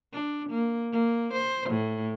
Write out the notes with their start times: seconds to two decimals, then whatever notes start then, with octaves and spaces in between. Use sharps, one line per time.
0.13 D4
0.50 A#3
0.92 A#3
1.34 C5
1.70 A2